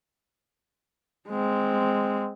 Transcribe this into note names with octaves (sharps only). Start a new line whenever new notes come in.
G#3 C4